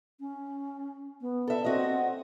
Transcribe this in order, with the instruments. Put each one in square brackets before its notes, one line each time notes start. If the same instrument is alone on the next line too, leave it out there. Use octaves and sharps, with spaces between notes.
[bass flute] C#4
B3
[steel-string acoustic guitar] A4 E5
[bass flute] C4 [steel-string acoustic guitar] F#4 D#5